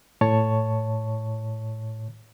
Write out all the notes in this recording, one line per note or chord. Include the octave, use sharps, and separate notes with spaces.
A2 C#5 A5 C#6